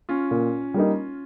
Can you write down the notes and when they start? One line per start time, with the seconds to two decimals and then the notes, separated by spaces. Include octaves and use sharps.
0.09 C#4 F4
0.31 A#2
0.74 G3 A#3 D#4